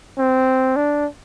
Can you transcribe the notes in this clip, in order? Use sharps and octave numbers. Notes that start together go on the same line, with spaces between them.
C4
D4